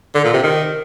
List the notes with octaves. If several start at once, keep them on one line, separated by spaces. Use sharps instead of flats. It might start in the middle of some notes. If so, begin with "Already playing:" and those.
D3
A#2
C3
D#3